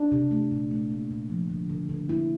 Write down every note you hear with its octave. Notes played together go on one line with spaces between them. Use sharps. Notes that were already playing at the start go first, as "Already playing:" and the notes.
Already playing: D4
C3
A3
A#2
A3
A#3
A#2
F3
D3
D3
D3
A#3 E4